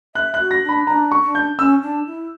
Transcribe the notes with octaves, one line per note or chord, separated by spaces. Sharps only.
E5 F#6
F#6
F#4
A#6
D4
B5
D4 A#5
C#6
D4
G6
C#4 E6
D4
E4